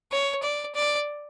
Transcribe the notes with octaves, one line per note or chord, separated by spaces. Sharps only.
C#5
D5
D5